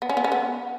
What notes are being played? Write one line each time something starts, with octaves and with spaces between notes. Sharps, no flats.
B3
C#4
B3
C#4
B3